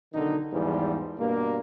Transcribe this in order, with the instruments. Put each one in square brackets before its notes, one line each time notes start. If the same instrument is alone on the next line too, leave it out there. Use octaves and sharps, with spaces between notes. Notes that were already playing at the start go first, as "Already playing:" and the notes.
[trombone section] B1 D3 D#3 D#4
E2 G#2 E3 F3 G3
G2 B2 A#3